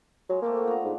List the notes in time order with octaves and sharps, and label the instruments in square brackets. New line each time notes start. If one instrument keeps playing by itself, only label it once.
[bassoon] F#3 [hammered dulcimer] G#3
[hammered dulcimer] A3 C4 G4 [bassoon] A#3
[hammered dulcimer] F4 F#4
B3 D4 A#5
[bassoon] G#2